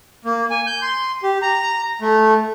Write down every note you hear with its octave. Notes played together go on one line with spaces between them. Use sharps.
A#3
G#5
G6
C6
G4
A#5
A3